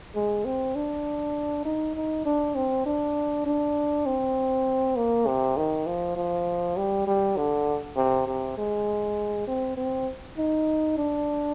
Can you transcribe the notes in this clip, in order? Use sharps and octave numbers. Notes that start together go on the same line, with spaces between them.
G#3
C4
D4
D#4
D#4
D4
C4
D4
D4
C4
A#3
C3
D#3
F3
F3
G3
G3
D3
C3
C3
G#3
C4
C4
D#4
D4